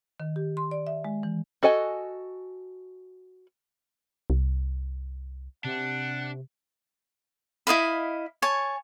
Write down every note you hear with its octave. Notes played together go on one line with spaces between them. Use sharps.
D#3
G4
C6
D5
E5
G#3
E3
F#4 A4 D#5 G#5
C2
C3 D4 F#5
E4 D#5 F5 B5
C#5 G#5 A5